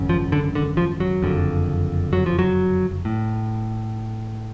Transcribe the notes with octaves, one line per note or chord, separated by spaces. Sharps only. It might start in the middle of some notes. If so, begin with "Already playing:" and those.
Already playing: G#1 F#2 C#3
F3
D3
D3
F3
F#3
F#1 F2 D3
F#3
F3
F#3
A2